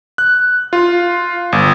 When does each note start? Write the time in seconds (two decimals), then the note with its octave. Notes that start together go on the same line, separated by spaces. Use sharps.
0.18 F#6
0.73 F4
1.52 G1